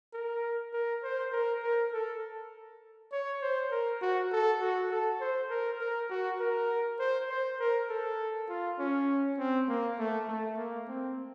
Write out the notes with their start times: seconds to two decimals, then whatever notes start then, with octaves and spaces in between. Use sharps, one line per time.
0.13 A#4
0.73 A#4
1.03 C5
1.32 A#4
1.63 A#4
1.92 A4
3.12 C#5
3.42 C5
3.71 A#4
4.02 F#4
4.32 A4
4.61 F#4
4.91 A4
5.21 C5
5.50 A#4
5.80 A#4
6.10 F#4
6.40 A#4
6.99 C5
7.29 C5
7.60 A#4
7.89 A4
8.49 F4
8.79 C#4
9.38 C4
9.68 A#3
9.99 A3
10.28 A3
10.57 A#3
10.88 C4